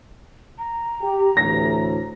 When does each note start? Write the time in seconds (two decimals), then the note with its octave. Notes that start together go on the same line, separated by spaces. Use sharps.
0.58 A#5
1.02 G4
1.37 D2 A2 E3 A#6